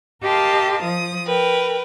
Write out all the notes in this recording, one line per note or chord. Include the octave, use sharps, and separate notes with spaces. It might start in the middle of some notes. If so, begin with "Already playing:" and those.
G4 A#4 D#5 F5 A5 C6
F3 D#6
A#4 B4 G5